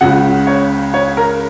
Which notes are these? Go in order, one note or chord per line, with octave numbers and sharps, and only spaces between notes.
C#2 C#3 F#5
C#5
C#5
A#4